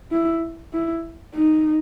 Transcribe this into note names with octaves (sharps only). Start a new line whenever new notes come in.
E4
E4
D#4